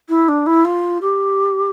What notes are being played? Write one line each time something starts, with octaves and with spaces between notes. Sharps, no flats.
E4
D4
E4
F4
G4